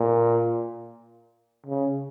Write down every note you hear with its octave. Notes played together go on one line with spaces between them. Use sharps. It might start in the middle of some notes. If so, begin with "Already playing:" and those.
Already playing: A#2
C#3